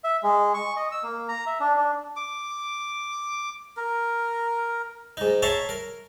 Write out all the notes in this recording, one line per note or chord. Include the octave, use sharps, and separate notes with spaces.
E5
G#3
C#6
D#5
E6
A#3
A#5
E5
D4
D4
D6
A#4
G#2 D#4
C#5 E5 A5 A#5 C6 C#6
A#4